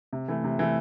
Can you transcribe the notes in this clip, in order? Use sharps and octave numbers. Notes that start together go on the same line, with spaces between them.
C3
E3 A3
C3
E3 A3